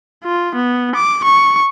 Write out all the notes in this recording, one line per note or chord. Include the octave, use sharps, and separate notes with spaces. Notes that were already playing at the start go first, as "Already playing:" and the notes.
F4
B3
D6
C#6